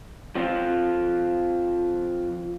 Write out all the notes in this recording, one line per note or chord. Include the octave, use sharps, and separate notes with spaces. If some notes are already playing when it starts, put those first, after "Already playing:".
F3 C4 F4